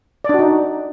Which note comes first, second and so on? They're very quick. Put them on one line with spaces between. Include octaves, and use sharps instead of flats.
D5 D4 F#4 D#4